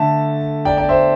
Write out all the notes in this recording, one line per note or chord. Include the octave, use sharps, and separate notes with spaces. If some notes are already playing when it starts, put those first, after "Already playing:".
Already playing: D3 A3 E5 A5
D5 G5
D5 G5
C5 E5